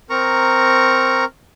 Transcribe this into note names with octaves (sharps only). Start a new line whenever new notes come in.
C4 A#4 A#5 C#6